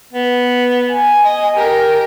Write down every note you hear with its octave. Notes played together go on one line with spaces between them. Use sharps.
B3
G#5
D#5
G4 A#4